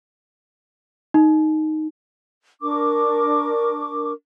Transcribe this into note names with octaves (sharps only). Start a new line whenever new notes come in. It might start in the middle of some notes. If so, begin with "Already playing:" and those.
D#4
D4 A#4 C#6 D6